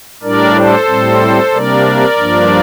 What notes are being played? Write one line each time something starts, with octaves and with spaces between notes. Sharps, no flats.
A2 G3 D4 A#4 D5
A4 C5
A2 G3 C4
C3 G3 A#3 D4 A#4 D5
G2 F3 A#3 D4